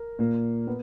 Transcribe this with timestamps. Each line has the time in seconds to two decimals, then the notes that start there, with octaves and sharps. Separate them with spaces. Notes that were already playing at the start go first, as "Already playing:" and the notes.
Already playing: A#4
0.19 A#2 A#3
0.67 B3